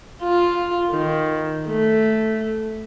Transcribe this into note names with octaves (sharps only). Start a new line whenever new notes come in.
F4
D#3
A3